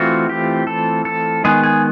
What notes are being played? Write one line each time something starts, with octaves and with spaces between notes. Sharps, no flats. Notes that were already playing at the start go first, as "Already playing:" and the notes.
Already playing: E3 A3 C4 F4 F#4
G4
A4
A4
D#3 G#3 B3 G#4
G#4